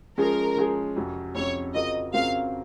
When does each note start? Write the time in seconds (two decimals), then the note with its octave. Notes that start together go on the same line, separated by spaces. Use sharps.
0.18 F3 G#3 C#4 G#4 A#4
0.57 F3 G#3 C#4 G#4
0.96 F2 C3 F#3 C#4
1.35 F2 C3 F#3 C#4 C#5
1.74 C#3 F#3 C4 F4 A#4 D#5
2.14 C#3 F#3 C4 F4 A#4 F5